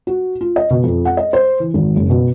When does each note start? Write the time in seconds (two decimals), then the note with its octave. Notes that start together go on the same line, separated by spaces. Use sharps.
0.07 F#4
0.41 F4
0.56 D#5
0.70 B2
0.84 F2
1.05 F#5
1.17 D#5
1.33 C5
1.60 E3
1.74 G#1
1.96 F#1
2.10 B2